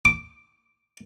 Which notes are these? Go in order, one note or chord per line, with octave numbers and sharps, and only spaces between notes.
D6